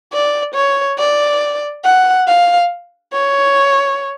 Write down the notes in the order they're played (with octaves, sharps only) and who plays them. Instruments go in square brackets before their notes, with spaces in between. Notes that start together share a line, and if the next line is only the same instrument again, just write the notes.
[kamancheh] D5
C#5
D5
F#5
F5
C#5